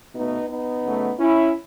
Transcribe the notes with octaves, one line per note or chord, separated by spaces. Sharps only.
B2 A3 B3 D#4
B3 D#4
C#3 F#3 A3
C#4 E4